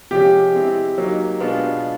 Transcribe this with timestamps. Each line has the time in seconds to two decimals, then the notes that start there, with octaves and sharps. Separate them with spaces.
0.11 C3 F3 G#3 C#4 G4
0.54 G#3 C4 E4
0.98 F#3 A#3 D#4
1.40 B2 G#3 B3 D4 F4